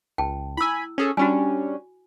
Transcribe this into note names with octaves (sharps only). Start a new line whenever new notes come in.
C#2 G5 A5
E4 G#5 B5 E6
C#4 G#4 A4
G3 C#4 D4 F#4 G#5